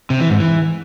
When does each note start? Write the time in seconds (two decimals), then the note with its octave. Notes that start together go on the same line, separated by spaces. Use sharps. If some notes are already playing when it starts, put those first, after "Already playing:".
0.10 C3
0.20 E3
0.30 G#2
0.40 E3